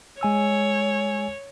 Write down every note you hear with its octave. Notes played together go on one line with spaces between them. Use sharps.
G#3 C#5 G#5 E6